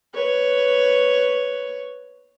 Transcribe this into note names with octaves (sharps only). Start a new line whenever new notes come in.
B4 C#5